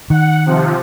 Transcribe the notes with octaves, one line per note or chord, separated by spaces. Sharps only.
D#3 F#5
C3 F3